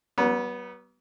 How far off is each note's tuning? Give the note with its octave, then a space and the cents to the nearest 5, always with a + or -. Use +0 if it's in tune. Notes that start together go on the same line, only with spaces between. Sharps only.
F#3 +45 B3 -20